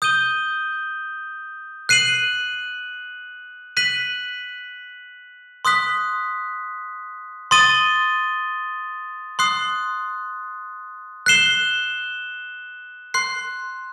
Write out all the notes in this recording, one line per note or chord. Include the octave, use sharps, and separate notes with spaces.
D#6 G6 D#7 G7
F#6 C7 D#7 F#7
F#6 B6 D#7 F#7
C6 D#6 F#6 B6
C6 D#6 A6 D#7 G7
C6 D#6 F#6 C7
F#6 C7 E7 G7
C6 F#6 C7